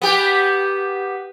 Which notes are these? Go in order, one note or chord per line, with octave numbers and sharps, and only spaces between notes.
B3 G4